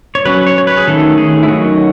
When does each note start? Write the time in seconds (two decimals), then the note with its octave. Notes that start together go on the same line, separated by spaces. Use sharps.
0.15 C#5
0.25 F#3 C#4 B4
0.47 C#5
0.58 C#5
0.67 B4
0.77 G#4
0.87 D#3 A3 C#4 A4
1.18 G#4
1.43 E4
1.48 D#3 F#3 C#4 F#4